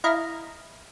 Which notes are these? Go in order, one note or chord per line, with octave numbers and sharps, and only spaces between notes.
E4 D#5 F5 A#5